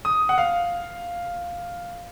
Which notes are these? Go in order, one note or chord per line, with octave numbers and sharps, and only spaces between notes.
D#6
F#5
F5